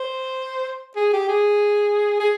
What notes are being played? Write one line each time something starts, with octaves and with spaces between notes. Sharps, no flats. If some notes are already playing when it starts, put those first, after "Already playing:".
Already playing: C5
G#4
G4
G#4
G#4